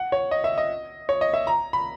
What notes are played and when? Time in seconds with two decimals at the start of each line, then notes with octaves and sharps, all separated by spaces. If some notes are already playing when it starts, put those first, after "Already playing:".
Already playing: F#5
0.12 C#5
0.31 D#5
0.44 E5
0.58 D#5
1.09 C#5
1.21 D#5
1.34 E5
1.47 A#5
1.73 B5